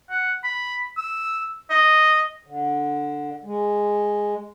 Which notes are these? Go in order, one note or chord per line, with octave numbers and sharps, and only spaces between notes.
F#5
B5
E6
D#5
D3
G#3